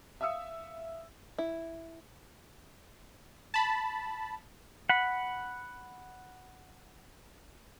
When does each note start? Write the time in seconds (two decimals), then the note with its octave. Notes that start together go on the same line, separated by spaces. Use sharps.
0.21 E5 F5 D#6 E6 C#7
1.39 E4
3.54 A5 B5
4.89 F#5 B5